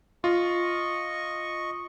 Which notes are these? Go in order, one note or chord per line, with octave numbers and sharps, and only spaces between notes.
F4 D#5 C#6